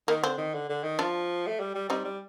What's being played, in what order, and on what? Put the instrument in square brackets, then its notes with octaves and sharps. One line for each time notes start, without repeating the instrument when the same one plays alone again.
[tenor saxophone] D#3 [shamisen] A#3
[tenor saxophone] D3 [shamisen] C4
[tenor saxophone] D#3
D3
D3
D#3
[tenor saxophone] F3 [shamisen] D4 F4
[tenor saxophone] A3
G3
G3
[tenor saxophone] G3 [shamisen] C4 D#4
[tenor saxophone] G3